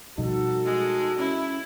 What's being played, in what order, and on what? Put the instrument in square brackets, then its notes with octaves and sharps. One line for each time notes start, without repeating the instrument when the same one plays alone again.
[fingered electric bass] B2 F3 G3 [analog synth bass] D#4 [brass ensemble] F#4 A4
[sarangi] G#3
[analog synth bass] C#4 [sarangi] E4